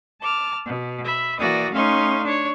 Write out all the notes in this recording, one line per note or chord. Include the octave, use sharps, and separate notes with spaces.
A5 D6 F6
B2
E5 B5
E3 A#3 F#4 D5 D#6 A#6
A3 C#4 D#4 F5 C6 C#6
D4 C#5